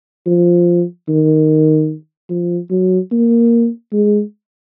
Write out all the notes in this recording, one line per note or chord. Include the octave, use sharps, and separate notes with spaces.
F3
D#3
F3
F#3
A#3
G#3